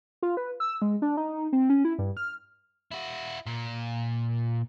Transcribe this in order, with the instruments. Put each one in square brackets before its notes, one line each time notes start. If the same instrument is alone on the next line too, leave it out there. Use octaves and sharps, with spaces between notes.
[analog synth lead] F4
B4
E6
G#3
D4
D#4
C4
C#4
E4
G2
F6
[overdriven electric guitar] E4 F#4
A#2